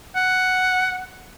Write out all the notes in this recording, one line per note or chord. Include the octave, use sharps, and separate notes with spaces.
F#5